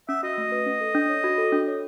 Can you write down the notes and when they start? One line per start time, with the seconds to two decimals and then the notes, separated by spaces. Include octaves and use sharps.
0.09 C#4 E5
0.23 F#4 D#5
0.38 A3
0.52 B4
0.66 C#4
0.81 A4
0.95 D4
1.09 C#5
1.24 F#4
1.38 A4
1.52 D4
1.68 C#5